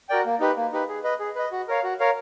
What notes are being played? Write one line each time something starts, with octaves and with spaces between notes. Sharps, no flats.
F#4 A#4 D5 G5
A#3
D#4 G4 B4
A#3
D#4 G4 B4
G#4
B4 D#5
G#4
B4 D#5
F#4
A#4 C#5 F5
F#4
A#4 C#5 F5